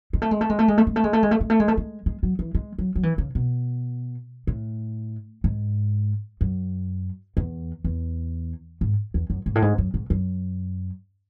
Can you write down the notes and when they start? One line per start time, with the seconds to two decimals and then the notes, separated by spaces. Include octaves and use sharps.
0.13 G#3
0.22 A3
0.31 G#3
0.41 A3
0.50 G#3
0.59 A3
0.68 G#3
0.78 A3
0.87 G#3
0.96 A3
1.04 G#3
1.13 A3
1.23 G#3
1.31 A3
1.41 G#3
1.50 A3
1.60 G#3
1.68 A3
1.77 G#3
2.06 G#3
2.23 F#3
2.39 E3
2.55 G#3
2.79 F#3
2.95 F#3
3.03 E3
3.18 C#3
3.35 B2
4.47 A2
5.44 G#2
6.41 F#2
7.37 E2
7.84 E2
8.81 G#2
9.14 E2
9.30 F#2
9.46 G#2
9.55 A2
9.62 G#2
9.78 F#2
9.94 G#2
10.10 F#2